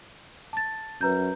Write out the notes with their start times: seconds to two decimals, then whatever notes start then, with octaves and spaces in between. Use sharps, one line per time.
0.53 A5 A6
1.01 F#2 B4 A#5 G6